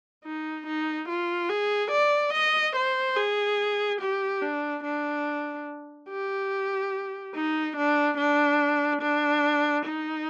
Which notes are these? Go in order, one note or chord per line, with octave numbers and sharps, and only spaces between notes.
D#4
D#4
F4
G#4
D5
D#5
C5
G#4
G4
D4
D4
G4
D#4
D4
D4
D4
D#4